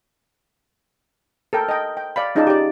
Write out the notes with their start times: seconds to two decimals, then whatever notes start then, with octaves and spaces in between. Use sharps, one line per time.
1.53 A4 A#4 G5
1.69 D#5 G5
1.97 G5
2.16 D5 F5 B5
2.35 C#4 D#4 F4 G#4 D5 A5
2.47 G4 D5